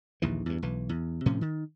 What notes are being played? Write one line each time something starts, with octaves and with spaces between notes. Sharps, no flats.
A#1 D#2 E3
E2 G2
B1 E3
E2
A2 C3 F3 C#4
D#3